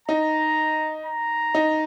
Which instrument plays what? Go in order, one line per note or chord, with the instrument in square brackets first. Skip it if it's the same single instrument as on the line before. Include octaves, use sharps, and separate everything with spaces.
[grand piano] D#4 [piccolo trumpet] A#5
[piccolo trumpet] A#5
[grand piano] D#4